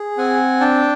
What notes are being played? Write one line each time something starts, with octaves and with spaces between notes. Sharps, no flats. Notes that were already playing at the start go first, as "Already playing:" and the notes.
Already playing: G#4
C4 F#5 G#5
D4 G5 A5